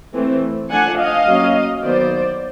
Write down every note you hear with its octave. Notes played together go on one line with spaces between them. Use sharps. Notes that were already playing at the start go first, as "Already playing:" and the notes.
E3 A3 C4
F3 A3 D4 F#5 G#5
D#5 F5
F#3 A#3 C#4
D#3 F#3 B3 C5 D5